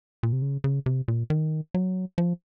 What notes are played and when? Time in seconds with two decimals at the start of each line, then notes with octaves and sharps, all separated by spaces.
0.23 A#2
0.33 C3
0.42 C#3
0.64 C#3
0.86 C3
1.08 A#2
1.30 D#3
1.74 F#3
2.18 F3